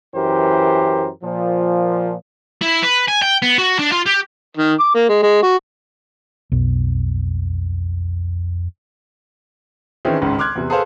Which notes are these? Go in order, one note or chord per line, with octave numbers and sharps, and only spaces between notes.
F#2 E3 G4 A#4 C5
A#2 F3
E4
B4
G#5
G5
B3
F#4
D4
F4
G4
D#3
D6
A#3
G#3
G#3
F#4
B1 F2
D#3 E3 C4 C#4 E4 G#4
G#1 C#2 G#2 C#3
C6 D6 F6 F#6 G#6
E2 C3
G#4 A4 B4 C5 F5